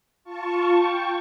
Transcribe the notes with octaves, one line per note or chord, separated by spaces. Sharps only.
F4 A5 C#6
G5 C#6